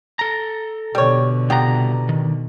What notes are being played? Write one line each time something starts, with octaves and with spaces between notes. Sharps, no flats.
A4 A#5
B2 D3 G3 C#5
C2 B3 F4 G4 A#5
D#3